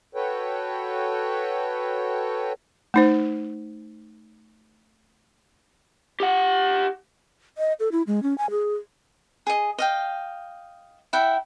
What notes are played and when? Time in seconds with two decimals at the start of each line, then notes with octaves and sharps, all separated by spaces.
0.15 F#4 A4 B4 C#5 G5
2.94 A3 D#4 C5
6.20 G4 F#5
7.58 D#5
7.80 A4
7.92 E4
8.07 G#3
8.23 C#4
8.38 G#5
8.50 G#4
9.47 G#4 D#5
9.79 D#5 F5 G5
11.13 E4 E5 F#5 G5